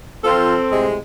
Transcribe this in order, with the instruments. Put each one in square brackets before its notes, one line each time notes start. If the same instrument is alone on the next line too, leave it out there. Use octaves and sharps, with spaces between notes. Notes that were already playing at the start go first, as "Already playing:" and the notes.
[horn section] F3 F4 [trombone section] C4 [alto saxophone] A4
[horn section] A2 C3 G#3